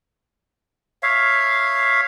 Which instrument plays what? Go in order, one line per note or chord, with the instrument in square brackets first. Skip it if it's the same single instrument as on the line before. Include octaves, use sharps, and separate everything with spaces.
[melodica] C#5 E5 F5